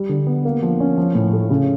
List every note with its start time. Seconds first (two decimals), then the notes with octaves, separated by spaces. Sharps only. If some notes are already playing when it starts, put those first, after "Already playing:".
Already playing: G3
0.09 D3
0.27 B3
0.45 A#3
0.62 F3
0.80 C#4
0.98 F3
1.15 A2
1.33 A3
1.50 C#3